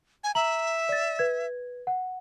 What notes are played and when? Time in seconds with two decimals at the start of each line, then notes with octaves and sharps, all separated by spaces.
0.24 G#5
0.35 E5 A#5 F#7
0.89 D5 A6
1.19 B4 G#6
1.87 F#5